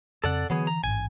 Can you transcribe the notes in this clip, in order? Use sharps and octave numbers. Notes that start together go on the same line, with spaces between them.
F2 C#3 C4 A4 D5 F#5
D3 E3 F#3 B3 G#4
A#5
A1 G#2 G#5